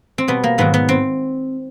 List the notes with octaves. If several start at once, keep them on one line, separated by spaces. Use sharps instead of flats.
C4
B2 G3 B3
A#3
G#2 D#3 F#3 B3
B3
C4